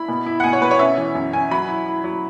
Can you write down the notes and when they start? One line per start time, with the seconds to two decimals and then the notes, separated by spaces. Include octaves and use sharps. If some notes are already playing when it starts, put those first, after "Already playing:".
Already playing: E4 B5
0.08 B2
0.26 E4
0.40 F#5
0.44 B2 G#5
0.53 C#5
0.62 B2 B4
0.71 C#5
0.79 C#4 E5
0.97 E3
1.15 F#2
1.33 C#4 G#5
1.51 F#3 B5
1.68 E4
1.86 E4
2.04 F#3